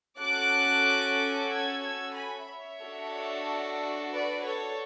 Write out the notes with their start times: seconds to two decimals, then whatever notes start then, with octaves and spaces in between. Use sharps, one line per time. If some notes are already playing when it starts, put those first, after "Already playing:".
0.20 C#4 F#4 A4 D6 F#6
1.50 E6 G#6
1.84 E6 G#6
2.16 G#5 B5
2.48 C#5 E5
2.81 D4 F#4 A4
4.12 B4 D5
4.44 A4 C#5